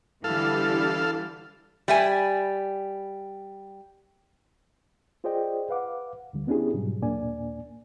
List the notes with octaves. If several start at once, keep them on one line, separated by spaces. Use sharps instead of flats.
D3 E3 G3 A4 F5
G3 E5 G#5
F4 G#4 C5 D5 D#5 G5
B4 F5 F#5 D6
D2 D3 G3
B3 C#4 D4 E4 G4 G#4
G#2 B2 F#3 G3
D#2 A#2 A#3 D4 D5 G#5